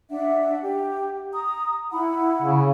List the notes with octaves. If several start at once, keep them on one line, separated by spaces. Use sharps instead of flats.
D4 E5 F#5
G4
A#5 D#6
E4 F#5 B5
C#3